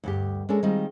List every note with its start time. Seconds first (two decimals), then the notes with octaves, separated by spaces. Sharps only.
0.04 D2 G2 G4
0.49 G#3 C#4 D4 A4 A#4
0.63 D#3 G3 G#3 C4 D#4 F4